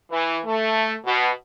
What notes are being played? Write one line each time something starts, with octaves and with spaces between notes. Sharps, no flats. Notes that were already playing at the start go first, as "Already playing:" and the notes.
E3
A3
B2